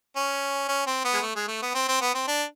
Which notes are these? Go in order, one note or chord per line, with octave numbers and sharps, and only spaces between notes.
C#4
C#4
C4
B3
G#3
A3
G#3
A3
B3
C4
C4
B3
C4
D4